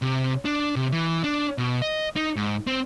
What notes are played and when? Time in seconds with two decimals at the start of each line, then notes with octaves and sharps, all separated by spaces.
0.02 C3
0.45 D4
0.76 C3
0.92 E3
1.24 D4
1.58 B2
1.82 D#5
2.16 D#4
2.36 G#2
2.67 C4